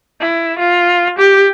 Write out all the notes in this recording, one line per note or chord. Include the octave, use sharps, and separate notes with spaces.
E4
F4
G4